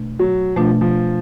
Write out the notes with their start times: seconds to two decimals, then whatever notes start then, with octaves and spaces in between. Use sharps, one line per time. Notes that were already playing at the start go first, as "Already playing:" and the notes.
Already playing: B2 A3 D4
0.19 F#3
0.56 B2 F3 A3 D4
0.81 F3